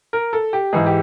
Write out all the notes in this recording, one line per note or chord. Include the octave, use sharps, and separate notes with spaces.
A#4
A4
G4
G#2 E3 G#3 G#4
G4